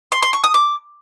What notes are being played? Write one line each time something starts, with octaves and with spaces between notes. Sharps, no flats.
C6
C6
C#6
D#6
D6